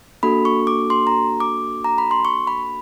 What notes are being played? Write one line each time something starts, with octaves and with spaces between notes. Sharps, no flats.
A#3 D4 F#4 A4 B5
C#6
D6
C6
A#5
D6
A#5
B5
C6
C#6
B5